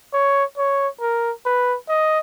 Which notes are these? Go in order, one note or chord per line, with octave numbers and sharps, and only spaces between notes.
C#5
C#5
A#4
B4
D#5